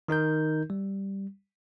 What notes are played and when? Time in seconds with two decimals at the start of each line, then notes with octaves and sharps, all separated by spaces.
0.08 D#3 D#4 A#4 G6
0.70 G3